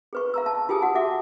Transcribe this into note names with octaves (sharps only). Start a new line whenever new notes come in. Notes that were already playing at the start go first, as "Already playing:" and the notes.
G#4 B4 C#6
F5 A#5 E6
F5 A5
F4 G4 G#4 G#5 A5 D#6
F#4 F#5
E5 F#5 D6